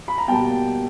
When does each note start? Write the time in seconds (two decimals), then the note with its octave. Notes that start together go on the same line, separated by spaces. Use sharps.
0.08 B5
0.18 A#5
0.28 B2 G3 A#3 G5 A5